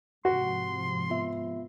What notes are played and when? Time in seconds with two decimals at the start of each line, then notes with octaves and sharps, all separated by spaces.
0.25 G#2 C3 F3 F#4 C6
1.10 B3 F4 E5